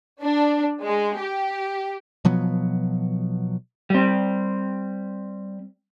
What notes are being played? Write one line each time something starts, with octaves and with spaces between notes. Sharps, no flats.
D4
G#3
G4
B2 F3 F#3 B3
G3 C4